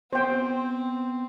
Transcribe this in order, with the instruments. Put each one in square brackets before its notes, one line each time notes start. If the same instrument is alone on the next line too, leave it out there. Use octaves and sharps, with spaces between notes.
[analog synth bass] B3 [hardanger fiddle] C4 [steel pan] C5 G5